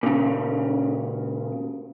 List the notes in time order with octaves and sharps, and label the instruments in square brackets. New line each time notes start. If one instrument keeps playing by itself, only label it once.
[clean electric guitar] A#2 C#3